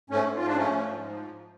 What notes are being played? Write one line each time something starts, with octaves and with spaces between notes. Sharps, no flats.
G#2 A3 C#4
G#2
F3 F4
D4
F3 A3 C#4
F3
G#2
F3